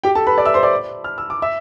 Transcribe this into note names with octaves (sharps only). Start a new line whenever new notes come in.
G4 G5
A4 A5
B4 B5
D5 D6
E5 E6
C5 C6
D5 D6
F6
E6
D6
E5 E6